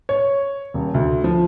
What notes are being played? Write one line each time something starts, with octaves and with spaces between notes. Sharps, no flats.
C#5
D#1
D2
F3